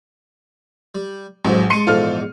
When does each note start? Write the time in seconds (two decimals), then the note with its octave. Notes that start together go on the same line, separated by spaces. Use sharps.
0.95 G3
1.45 A1 F2 G#2 F#3
1.70 G#3 A5 C6 C#7 D#7
1.87 A#1 E2 G#2 F4 A4 F6